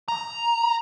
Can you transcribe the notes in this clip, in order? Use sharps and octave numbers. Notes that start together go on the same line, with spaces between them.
A#5